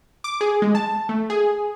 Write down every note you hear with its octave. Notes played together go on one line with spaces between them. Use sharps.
D6
G#4
G#3
A5
A3
G#4